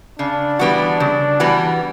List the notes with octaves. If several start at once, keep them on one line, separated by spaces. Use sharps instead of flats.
C#3 D4
E3 G3 B3 F#4
C#3
E3 G3 B3 F#4